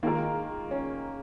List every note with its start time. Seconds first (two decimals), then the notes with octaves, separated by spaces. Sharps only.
0.03 D#3 G#3 A#3 F4 A#4
0.71 C#4